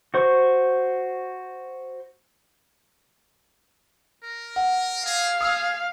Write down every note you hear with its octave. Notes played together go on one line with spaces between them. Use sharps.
F#4 C5 C#6
A#4
F#5
G#4 F5
G#4 D#6 E6